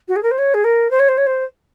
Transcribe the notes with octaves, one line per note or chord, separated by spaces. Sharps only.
F#4
G#4
A#4
C5
C#5
G#4
A#4
C5
C#5
C5
C#5
C5